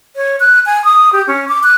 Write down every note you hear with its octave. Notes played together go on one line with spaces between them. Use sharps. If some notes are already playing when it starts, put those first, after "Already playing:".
C#5
F#6
G#5
D#6
G4
C#4
D6
F#6